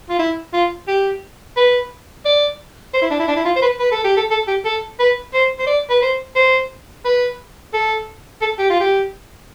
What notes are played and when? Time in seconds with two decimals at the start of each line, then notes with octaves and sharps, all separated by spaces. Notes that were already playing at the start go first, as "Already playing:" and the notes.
0.10 F4
0.19 E4
0.53 F4
0.88 G4
1.57 B4
2.25 D5
2.94 C5
3.02 E4
3.11 D4
3.20 E4
3.28 D4
3.36 E4
3.45 F4
3.56 C5
3.62 B4
3.79 B4
3.92 A4
4.04 G4
4.17 A4
4.31 A4
4.48 G4
4.65 A4
5.00 B4
5.34 C5
5.59 C5
5.67 D5
5.90 B4
6.02 C5
6.36 C5
7.05 B4
7.74 A4
8.41 A4
8.59 G4
8.70 F4
8.81 G4